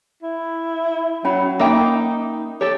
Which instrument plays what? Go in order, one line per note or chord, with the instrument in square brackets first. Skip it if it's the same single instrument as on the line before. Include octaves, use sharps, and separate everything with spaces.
[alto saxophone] E4
[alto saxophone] F#3 [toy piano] C#4 F#5 B5
[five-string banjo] A#3 E5 G5 [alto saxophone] D#4
[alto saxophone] G4 [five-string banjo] A4 C#5